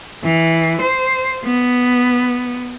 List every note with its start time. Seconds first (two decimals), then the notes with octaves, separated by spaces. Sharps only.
0.23 E3
0.81 C5
1.45 B3